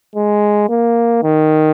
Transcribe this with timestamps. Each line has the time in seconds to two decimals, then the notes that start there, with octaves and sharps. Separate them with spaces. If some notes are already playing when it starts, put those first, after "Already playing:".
0.15 G#3
0.69 A#3
1.23 D#3